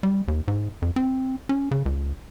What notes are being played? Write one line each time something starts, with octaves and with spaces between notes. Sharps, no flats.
G3
D#2
G#2
F2
C4
C#4
C#3
C#2